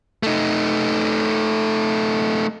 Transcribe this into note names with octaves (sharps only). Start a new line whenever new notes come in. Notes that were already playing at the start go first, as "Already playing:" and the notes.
A3 D#4